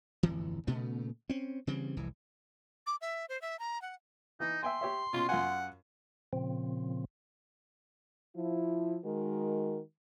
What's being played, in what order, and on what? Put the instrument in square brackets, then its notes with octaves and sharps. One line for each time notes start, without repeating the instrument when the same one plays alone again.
[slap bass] D1 G1 F2 E3
A#2 C#3 A3 B3
C4 C#4
C#3 E3 G3 C4
F1 C2 E3
[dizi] D6
E5
C5
E5
A#5
F#5
[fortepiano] E3 [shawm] D#4
[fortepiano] E5 G5 G#5 [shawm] C6
[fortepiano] G4 C#5 E5
[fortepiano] B2 C#4 [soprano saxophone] F4
[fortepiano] F#2 F4 G#5 [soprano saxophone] F#5
[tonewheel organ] A#2 C#3 F3 C4
[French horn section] F3 E4
D#3 G#3 F#4 A#4